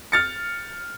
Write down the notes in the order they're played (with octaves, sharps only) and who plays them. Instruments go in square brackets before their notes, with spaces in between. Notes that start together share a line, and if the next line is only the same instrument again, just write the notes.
[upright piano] F6 A6 C#7